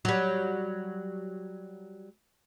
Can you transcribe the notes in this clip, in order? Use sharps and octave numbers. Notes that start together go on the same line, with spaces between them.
F#3 G3